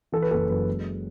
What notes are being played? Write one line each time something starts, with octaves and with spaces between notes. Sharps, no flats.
E3 A4
B4
F#1 A4
F#2 B4
G#3